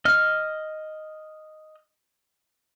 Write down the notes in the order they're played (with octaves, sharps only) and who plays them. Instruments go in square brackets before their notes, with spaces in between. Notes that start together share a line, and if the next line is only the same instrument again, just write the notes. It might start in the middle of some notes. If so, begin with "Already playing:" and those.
[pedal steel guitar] D#5 F6